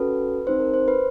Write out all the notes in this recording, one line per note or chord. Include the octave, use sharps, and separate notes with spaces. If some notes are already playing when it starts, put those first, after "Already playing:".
Already playing: C#4 F#4 A4 B4
C4 D#4 G4 C5
A#4
C5
B4